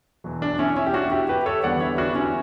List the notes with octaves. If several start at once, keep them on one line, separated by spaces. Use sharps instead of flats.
E2 B2 F#3
D4
C#4 E4
C#4 E4
G4
D4 F#4
E4 G4
G4 B4
A4 C#5
E2 D3 G3 B3 D5 F#5
C#5 E5
D4 F#4
C#4 E4